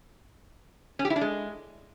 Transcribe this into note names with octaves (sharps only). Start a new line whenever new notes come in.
C#4
G4
E4
D4
G#3